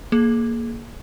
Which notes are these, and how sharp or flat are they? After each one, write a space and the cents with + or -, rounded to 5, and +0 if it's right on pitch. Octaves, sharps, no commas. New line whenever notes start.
A#3 +0 G#4 +30